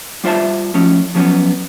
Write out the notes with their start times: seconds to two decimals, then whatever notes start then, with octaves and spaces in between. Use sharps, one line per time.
0.24 G3 F4 C5 E5 A5
0.74 A2 F3 C#4
1.15 F3 F#3 B3 C#4